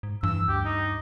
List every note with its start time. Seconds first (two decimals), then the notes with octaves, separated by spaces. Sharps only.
0.03 G#2
0.23 G2 E3 E6
0.48 D2 G4
0.65 D#4